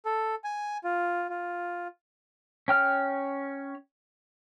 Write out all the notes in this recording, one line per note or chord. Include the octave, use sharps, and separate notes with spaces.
A4
G#5
F4
F4
C#4 G5 F6